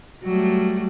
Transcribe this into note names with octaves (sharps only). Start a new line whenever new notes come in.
F#3 G3 A3